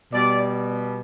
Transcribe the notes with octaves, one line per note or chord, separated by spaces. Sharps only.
B2 G3 D5